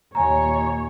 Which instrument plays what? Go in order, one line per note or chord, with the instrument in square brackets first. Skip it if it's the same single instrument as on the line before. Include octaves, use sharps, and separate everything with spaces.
[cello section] D#2 A#2 C#5 [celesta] G#5 A#5